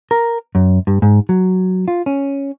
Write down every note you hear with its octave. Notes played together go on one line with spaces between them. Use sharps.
A#4
F#2
G2
G#2
F#3
F4
C#4